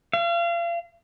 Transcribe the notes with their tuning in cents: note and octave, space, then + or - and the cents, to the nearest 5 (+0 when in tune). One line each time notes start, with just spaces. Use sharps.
F5 -35